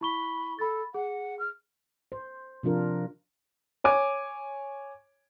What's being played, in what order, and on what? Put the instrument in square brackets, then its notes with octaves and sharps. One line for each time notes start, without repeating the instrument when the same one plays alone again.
[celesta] E4 C#6 G7 [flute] B5
[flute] A4 [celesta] B5 A6
[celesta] G#4 [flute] F#5
[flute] F6
[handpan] C5
C3 F3 D4 F4 A#4
[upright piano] C#5 G#5 D6